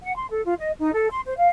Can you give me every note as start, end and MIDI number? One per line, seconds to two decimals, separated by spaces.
0.02 0.15 78
0.15 0.27 84
0.30 0.43 69
0.46 0.54 65
0.59 0.71 75
0.78 0.93 63
0.93 1.07 69
1.10 1.20 84
1.26 1.33 72
1.38 1.49 77